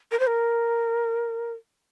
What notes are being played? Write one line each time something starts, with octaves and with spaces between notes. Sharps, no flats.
A#4
C5
A#4